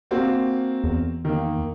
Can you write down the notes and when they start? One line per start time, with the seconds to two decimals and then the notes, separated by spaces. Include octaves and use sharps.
0.11 A#3 C4 F#4
0.84 E2
1.25 D#3 A#3